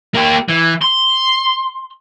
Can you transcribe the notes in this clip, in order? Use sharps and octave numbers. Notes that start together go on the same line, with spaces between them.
A#3 G4
E3
C6